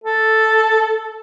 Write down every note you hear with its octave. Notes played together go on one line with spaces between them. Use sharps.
A4